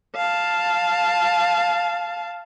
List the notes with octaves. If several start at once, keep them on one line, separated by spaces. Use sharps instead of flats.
F5 A5